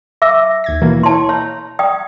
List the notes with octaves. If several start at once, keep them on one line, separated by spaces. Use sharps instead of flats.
E5 D6 E6
D#2 G#6 A#6
B2 E3 A#3
E4 C#5 A5 C6
C#5 A#5
D5 G5 D#6